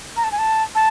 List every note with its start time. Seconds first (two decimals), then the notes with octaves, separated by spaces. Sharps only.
0.17 A#5
0.24 A5
0.32 G#5
0.38 A5
0.75 A5